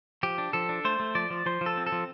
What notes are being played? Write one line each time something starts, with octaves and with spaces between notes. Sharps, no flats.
F3 G4
D4
F3 A4
D4
A3 C5
A3
F3 D5
F3
F3 C5
F3
A4
C4
A4
F3